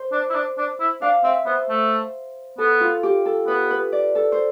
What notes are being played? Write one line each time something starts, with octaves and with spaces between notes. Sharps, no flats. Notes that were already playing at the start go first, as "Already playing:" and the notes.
Already playing: C5
D4
E4
D4
D4
E4
D4 F5
C4 E5
B3 C5
A3
B3 A4
F4
G4
A4
B3 B4
B4
D5
A4
C5